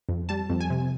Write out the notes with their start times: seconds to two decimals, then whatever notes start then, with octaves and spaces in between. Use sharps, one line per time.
0.09 F2
0.29 G3 A5
0.50 F2
0.61 G#5
0.70 C3